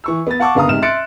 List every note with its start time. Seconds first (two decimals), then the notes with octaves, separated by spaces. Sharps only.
0.04 E3 C#6 E6
0.27 B3 A6
0.40 F5 F#5 A5 C#6 D6
0.55 F#1 D3 B3 F5 A#5 D#6
0.69 G#2 C3 F6 E7
0.82 E5 C6 F#6 A6 C#7 D7